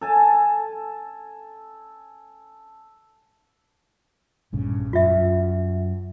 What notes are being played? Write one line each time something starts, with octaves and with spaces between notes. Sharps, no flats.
A4 G#5 A5
A#1 G2 C#3
F#2 F4 E5